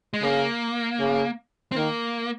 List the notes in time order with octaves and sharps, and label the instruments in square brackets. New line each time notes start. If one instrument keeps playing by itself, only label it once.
[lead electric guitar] G#3
[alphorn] C#3 [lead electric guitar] A#3
[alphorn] C#3
[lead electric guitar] C4
[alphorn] D#3 [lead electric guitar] A#3